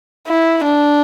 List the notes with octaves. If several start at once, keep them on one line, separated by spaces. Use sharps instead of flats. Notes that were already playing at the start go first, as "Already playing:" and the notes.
E4
D4